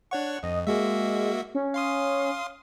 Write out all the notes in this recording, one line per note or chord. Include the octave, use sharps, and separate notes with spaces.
D4 C#5 F#5 C#6
F2 D#5
G#3 A#3 F#4 E5
C#4
F5 C6 D#6